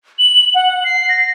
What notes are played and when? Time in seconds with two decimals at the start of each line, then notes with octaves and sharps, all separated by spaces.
0.19 F#7
0.55 F#5
0.84 C7
1.09 A#6